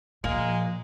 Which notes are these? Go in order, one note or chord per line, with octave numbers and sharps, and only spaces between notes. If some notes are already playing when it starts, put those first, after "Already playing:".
A#2 F3 G#3 A#3